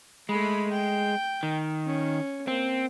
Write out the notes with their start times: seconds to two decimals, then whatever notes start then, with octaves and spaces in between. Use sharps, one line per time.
0.29 G#3 A3 B5
0.72 G5
1.43 D#3
1.86 C#4
2.48 A#3 C4